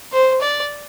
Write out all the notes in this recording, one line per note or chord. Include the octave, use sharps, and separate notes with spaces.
C5
D5